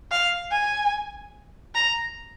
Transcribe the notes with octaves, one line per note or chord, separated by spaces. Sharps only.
F5
G#5
A#5